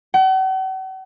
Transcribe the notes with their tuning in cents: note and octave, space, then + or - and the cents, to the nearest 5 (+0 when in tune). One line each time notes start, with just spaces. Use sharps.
F#5 +45